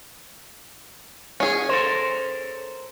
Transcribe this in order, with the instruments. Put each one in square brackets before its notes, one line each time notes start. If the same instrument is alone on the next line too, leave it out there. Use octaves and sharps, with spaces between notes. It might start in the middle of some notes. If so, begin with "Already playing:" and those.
[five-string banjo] C#4 G#4
[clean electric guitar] A4 A#4 C5